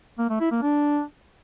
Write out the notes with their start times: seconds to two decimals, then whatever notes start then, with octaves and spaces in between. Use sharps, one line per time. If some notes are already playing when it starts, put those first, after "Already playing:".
0.18 A#3
0.29 A3
0.40 E4
0.51 A#3
0.62 D4